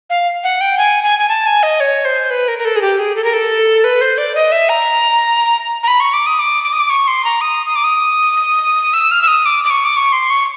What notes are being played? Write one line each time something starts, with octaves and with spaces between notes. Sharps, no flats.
F5
F#5
G5
G#5
G#5
G#5
A5
G#5
D#5
C#5
C5
B4
A#4
A#4
A4
G#4
G4
G#4
A4
A#4
A4
B4
C5
D5
D#5
E5
A#5
A#5
B5
C#6
D6
D#6
D6
D6
D#6
D6
C#6
C6
A#5
D#6
D#6
D6
D#6
E6
F6
E6
D#6
D6
D6
C#6
D6
C#6
C6
C#6